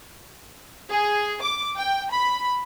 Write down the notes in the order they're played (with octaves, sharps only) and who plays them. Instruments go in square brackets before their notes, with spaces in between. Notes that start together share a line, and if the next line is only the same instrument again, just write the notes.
[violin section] G#4
D6
G5
B5